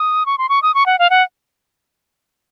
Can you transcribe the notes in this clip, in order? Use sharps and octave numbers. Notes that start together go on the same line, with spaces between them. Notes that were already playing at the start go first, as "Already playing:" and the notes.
Already playing: D#6
C#6
C6
C#6
D#6
C#6
F#5
F5
F#5